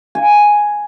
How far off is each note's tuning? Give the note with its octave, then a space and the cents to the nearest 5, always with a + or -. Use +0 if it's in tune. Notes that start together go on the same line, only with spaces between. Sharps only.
G#5 +0